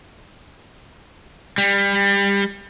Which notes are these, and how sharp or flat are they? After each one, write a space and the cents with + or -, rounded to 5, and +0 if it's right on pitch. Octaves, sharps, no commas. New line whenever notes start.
G3 +25